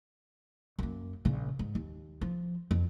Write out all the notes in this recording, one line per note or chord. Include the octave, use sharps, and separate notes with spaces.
F#2 A#3
A#1 C#3
G#2
D#2
F3
F2